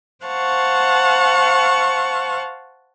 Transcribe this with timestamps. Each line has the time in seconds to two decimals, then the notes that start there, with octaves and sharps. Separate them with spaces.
0.25 C5 F5 F#5 A5 C#6